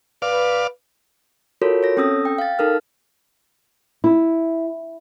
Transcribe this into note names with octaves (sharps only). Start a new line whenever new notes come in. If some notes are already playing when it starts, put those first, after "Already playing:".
B4 D5 F5
F4 F#4 A4 A#4 C#5
C#5 A#6
C4 C#4 A4 D#6 E6 A#6
G5
F5 A6
D#4 A4 A#4 F6
E4